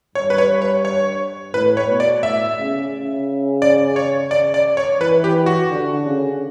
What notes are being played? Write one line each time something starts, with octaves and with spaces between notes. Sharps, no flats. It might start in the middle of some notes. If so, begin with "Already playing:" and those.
G2 C#5
B4
C#5
C#5
C#5
A2 B4
C#5
B2
D5
A2 E5
C#3
C#3
D5
C#5
D5
D5
C#5
E3 B4
G4
F#4
D3
C#3